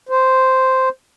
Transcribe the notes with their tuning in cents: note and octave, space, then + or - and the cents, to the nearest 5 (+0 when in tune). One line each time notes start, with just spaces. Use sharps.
C5 -5